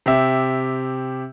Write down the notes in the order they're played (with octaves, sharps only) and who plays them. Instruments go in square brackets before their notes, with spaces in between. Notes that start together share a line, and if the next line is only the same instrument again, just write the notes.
[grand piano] C3 G4 E5